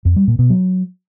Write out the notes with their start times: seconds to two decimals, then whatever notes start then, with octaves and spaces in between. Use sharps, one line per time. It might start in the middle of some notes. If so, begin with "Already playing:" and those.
0.05 F2
0.16 G3
0.28 A#2
0.39 B2
0.50 F#3